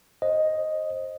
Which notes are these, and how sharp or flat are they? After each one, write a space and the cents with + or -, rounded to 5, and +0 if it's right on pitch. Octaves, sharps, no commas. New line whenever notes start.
C5 +25 D#5 +0